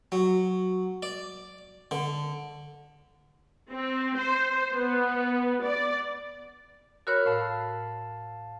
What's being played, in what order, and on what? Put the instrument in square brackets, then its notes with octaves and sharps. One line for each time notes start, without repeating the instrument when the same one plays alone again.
[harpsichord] F#3
D5
D3
[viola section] C4
C5
B3
D5
[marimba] F#4 A#4 C#5 [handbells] B5 E6 F6
[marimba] A2 [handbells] F5 A5